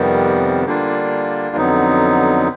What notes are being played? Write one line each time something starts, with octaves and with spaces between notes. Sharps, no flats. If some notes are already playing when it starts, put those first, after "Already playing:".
Already playing: F2 C3 D#3 G3 B3
D3 G3 A#3 D4 F4
F2 D3 F#3 B3 D#4